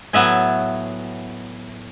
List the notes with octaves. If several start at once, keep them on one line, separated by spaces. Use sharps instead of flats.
A2 F#3 B3 E5 G#5